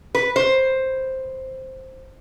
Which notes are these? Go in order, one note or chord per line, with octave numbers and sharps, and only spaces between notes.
B4
C5